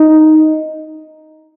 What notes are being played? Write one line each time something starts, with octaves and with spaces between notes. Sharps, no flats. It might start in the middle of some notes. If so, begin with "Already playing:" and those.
Already playing: D#4